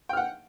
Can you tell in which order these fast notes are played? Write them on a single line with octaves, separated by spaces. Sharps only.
G5 F6 F#5